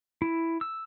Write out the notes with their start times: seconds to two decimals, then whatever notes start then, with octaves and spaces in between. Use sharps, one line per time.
0.22 E4
0.61 E6